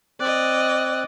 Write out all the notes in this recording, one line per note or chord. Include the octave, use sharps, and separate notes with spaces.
C4 D5 D#5 F#6